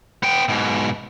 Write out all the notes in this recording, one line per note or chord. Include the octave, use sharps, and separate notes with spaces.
B3 G5
G#2 B2